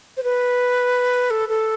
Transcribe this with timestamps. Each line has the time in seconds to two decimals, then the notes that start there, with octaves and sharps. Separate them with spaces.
0.17 C5
0.24 B4
1.31 A4
1.49 A4